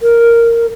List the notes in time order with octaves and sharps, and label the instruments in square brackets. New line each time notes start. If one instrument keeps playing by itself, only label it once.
[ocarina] A#4